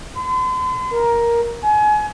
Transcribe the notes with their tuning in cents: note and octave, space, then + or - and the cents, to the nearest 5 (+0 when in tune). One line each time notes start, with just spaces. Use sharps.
C6 -45
A#4 +10
G#5 +30